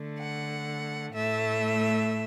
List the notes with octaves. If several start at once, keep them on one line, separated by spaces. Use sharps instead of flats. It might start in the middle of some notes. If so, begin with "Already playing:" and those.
Already playing: D3 A3
F#5
A2 A3 E5